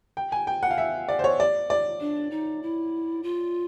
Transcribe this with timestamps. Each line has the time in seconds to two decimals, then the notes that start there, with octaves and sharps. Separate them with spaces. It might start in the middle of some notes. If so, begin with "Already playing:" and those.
0.17 G5
0.32 G#5
0.47 G5
0.63 F#5
0.71 F5
0.78 E5
1.08 D5
1.19 C5
1.24 C#5
1.40 D5
1.70 D5
2.00 D4
2.31 D#4
2.63 E4
3.23 F4